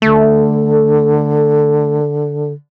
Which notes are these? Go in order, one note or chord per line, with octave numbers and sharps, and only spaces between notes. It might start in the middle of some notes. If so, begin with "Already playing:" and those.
D3 A3